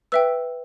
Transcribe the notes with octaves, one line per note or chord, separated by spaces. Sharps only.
B4 E5 G5 E6